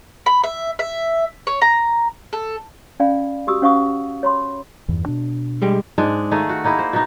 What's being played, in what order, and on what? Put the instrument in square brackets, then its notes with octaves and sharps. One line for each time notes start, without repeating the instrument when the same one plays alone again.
[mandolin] B5
E5
E5
C#5
A#5
A4
[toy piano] C#4 D5 F5 G#5 B5
F#4 G4 D#6 E6
C#4 C5 F5 F#5 C#6 D#6
C#5 B5 C6 D6
[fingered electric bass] E2 G2 E3
B2 D4
[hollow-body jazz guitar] G3 G#3 G4
[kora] G#2 G#3 D4
D#3 A3 G#4 F5
F#4
A#3 D#4 E4 G#4
C5
B2 D#4